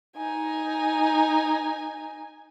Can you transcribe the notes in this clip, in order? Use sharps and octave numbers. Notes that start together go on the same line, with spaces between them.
D#4 G#5